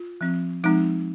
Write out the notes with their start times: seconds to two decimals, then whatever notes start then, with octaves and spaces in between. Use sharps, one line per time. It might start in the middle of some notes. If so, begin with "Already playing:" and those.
Already playing: F4
0.21 F3 C4
0.64 F3 G#3 C4 D#4